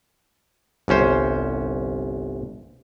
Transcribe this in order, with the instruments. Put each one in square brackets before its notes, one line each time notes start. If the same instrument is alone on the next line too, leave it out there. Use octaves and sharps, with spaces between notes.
[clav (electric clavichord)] G1 C2 C#4 C5